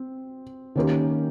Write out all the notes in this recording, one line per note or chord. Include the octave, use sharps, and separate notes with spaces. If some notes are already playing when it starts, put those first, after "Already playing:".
Already playing: C4
D#3 A#3 C#4 G4 A#4